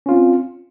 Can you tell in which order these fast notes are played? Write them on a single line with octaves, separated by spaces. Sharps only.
C#4 F4 C4